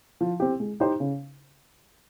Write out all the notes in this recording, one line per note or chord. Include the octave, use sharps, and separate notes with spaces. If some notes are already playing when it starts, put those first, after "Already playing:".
F3
C4 G4
G#3
D#4 G4 C5
C#3